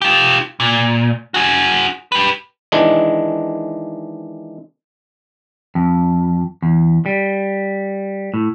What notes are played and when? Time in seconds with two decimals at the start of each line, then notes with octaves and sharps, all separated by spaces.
0.02 F4 G4
0.60 A#2
1.34 F#4 G#4
2.12 G4 B4
2.72 D#3 E3 G#3 D4
5.75 F2
6.63 E2
7.06 G3
8.34 A2